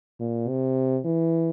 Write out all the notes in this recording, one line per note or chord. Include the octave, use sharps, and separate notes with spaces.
A#2
C3
E3